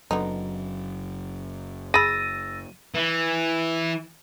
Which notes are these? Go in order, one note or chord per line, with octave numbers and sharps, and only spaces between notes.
F#1 D3 F#3 B3 D#4
G#4 B5 E6 A6 A#6 D#7
E3